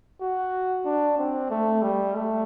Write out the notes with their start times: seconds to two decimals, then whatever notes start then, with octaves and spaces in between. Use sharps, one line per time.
0.21 F#4
0.85 D4
1.18 C4
1.50 A3
1.82 G3
2.15 A3